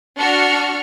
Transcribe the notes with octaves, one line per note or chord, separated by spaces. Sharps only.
D4 F#4 C#6 F6 C#7